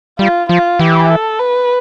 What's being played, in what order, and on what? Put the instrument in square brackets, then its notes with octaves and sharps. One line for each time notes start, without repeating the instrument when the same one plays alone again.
[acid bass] G3 [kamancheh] F4
[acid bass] F3 [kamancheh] F4
[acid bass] E3 [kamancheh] G4
[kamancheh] A4
B4